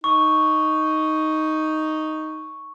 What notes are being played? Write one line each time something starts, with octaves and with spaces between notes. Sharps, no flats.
D#4 C#6